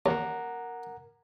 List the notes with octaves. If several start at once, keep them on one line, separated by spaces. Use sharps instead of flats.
D#2 A#4 F#5 A#5